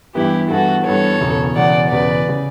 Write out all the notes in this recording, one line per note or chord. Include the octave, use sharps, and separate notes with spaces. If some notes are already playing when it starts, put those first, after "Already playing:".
G2 E3 B3 E4 G4
G2 E3 B3 F#4 A4
G2 E3 B3 A4 C#5
E1 E2 C#3
E1 E2 C#3 D5 F#5
E1 E2 C#3 B4 D5
C#3